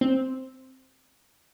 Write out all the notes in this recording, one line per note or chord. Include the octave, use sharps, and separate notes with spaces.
C4